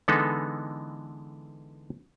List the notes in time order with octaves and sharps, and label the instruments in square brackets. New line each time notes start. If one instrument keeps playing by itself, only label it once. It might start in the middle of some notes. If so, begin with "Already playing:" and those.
[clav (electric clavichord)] D3 E3 G#3 B3 D#4 A4